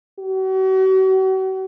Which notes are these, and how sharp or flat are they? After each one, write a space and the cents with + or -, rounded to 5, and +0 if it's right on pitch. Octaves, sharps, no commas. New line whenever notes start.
F#4 +40